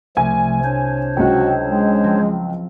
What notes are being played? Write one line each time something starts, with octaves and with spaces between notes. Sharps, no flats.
C2 F3 A3 G#5
D4 C5 C#5
C#2 F#3 E4 F#4 G5 C#7
G#3
F3 C4